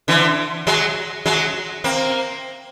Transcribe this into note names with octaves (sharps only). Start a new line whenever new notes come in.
D3 E3
F#3 G#3
F#3 G#3
A#3 C4